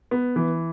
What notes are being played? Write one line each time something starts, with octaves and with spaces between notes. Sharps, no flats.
B3
E3